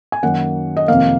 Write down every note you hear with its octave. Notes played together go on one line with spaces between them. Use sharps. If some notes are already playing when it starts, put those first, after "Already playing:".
G#5
F#2 D#3 F#3 A#3 F#5
D#5
F2 C3 D#3 A#3 F5